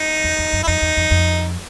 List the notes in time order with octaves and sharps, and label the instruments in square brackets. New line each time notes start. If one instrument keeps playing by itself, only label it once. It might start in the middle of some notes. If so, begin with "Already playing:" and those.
Already playing: [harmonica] D#4
[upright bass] E2
E2
F#2
[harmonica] E4
[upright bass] F2 [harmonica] D#4
[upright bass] E2
F2
F2